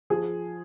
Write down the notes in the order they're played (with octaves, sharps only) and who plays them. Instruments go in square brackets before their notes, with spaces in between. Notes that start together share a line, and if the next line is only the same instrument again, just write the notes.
[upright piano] F3 G#4